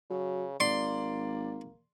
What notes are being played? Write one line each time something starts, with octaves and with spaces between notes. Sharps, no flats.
C#3 F#3
G#1 A#3 D5 C6